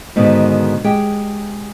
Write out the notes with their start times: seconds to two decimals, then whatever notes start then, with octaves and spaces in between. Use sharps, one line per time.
0.16 G#2 B2 D3 D#3
0.84 G#3 G4 G#4 G5